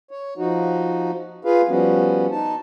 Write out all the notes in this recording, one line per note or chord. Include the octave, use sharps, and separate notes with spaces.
C#5
F3 D#4 F#4
F4 G#4 B4 F5
F3 G3 B3 C#4 F#4
D#4 A5